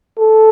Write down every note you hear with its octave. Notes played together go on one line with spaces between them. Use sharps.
A4